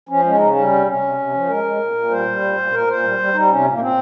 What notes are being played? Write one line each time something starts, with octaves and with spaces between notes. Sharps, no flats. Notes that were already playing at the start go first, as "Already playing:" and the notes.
F3 C#4
G#3 C#4
C#3 D#4
C#4
G3
C3
C3 C#4
C3
C3
F3
G#3 A#4
G#3
A#2
A#2
G3 C5
G3
A#2
A#2
A#2 A#4
A#2 C5
G3
G3
G3 D#4
C3 C#4
A#2
A#3
A#2 C4